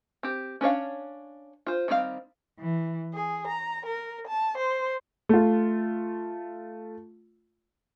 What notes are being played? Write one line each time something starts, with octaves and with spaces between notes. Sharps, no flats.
C4 G4
C#4 D4 C#5 F5
F4 C5
D#3 G3 C4 F4 F5
E3
G#4
A#5
A#4
A5
C5
A3 F4